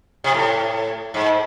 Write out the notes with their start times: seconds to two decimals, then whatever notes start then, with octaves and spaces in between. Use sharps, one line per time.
0.24 C3
0.34 A2
1.14 G#2